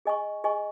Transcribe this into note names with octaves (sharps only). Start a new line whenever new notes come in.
G#4 D#5 G#5 C#6
G#4 D#5 G#5 C#6